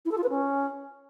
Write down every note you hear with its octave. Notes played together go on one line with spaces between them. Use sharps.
E4
A4
F4
B4
C#4